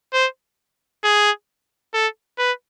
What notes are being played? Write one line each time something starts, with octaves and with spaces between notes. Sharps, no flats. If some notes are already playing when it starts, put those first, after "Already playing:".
C5
G#4
A4
B4